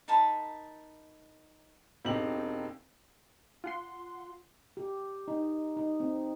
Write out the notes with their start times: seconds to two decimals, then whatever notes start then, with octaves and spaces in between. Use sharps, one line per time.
0.08 D#4 A#4 A5 B5
2.05 E1 C4 D#4 G4 F#7
3.64 F4 F#5 C6
4.77 G4
5.28 D#4
5.77 D#4
6.00 C4